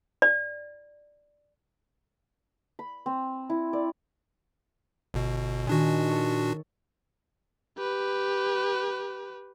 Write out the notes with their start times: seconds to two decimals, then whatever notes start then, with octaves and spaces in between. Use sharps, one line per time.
0.22 D5
2.79 B5
3.06 C4
3.50 E4
3.73 D5
5.14 G1 B2
5.67 A#2 D#3 D4 F#4 G#4
6.09 A4 C#5
7.77 G4 B4